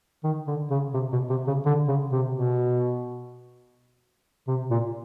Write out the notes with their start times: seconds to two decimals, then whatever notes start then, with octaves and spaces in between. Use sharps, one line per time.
0.24 D#3
0.47 D3
0.70 C#3
0.94 C3
1.12 B2
1.29 C3
1.47 C#3
1.65 D3
1.88 C#3
2.12 C3
2.35 B2
4.47 C3
4.70 A#2